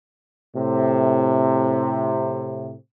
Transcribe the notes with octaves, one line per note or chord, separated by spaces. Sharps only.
A2 C3